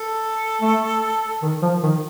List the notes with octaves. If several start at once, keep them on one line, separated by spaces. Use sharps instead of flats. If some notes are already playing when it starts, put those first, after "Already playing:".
Already playing: A4
A3
D#3
F3
D#3